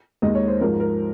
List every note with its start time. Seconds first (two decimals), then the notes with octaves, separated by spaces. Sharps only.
0.22 D#2 D#3 G#3 D#5
0.35 C#5
0.48 C5
0.61 G#2 F3 G#3 A#4
0.80 A#4